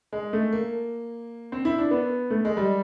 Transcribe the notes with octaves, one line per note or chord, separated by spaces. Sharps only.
G#3
A3
A#3
C4
E4
D4
B3
A3
G#3
G3